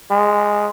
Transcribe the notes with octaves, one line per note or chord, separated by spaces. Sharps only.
G#3